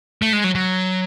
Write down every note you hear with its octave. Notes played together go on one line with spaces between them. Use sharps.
A3
G#3
F#3
F#3